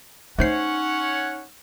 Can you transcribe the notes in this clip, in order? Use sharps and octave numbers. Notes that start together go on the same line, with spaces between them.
A3 C#4 D#4 C5 C#5 F#5 C7